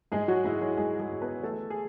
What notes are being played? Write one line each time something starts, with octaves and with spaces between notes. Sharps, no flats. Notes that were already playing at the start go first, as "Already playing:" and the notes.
G#2 G#3 G#4
F#3 F#4
G#2 E4
F#3 F#4
G#2 G#3 G#4
G#3 G#4
G#2
B3 B4
E3 A3 A4
G#4